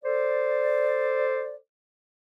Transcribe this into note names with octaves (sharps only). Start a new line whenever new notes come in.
A4 C5 D5